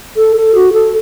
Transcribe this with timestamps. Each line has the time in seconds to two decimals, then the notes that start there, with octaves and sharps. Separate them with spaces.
0.17 A4
0.36 A4
0.55 F#4
0.73 A4